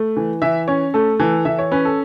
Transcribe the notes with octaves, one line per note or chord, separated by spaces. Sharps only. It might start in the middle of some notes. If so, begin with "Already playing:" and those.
Already playing: A3
E3
E3 E5
C#4 C#5
A3 A4
E3 A4
E3 E5
C#5
C#4 B4
A4